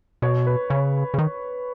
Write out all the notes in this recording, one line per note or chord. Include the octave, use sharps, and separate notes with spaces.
B2 C#5
B4
C#3 C#5
C#3
D#3